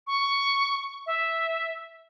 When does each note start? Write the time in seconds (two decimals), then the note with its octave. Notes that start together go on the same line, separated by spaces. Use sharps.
0.07 C#6
1.06 E5